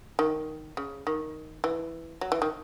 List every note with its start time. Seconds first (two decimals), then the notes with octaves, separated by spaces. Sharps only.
0.19 D#3
0.77 C#3
1.07 D#3
1.64 E3
2.21 F#3
2.32 E3
2.42 D#3